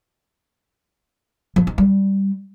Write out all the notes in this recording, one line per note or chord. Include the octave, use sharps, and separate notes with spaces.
F3
D#4
G3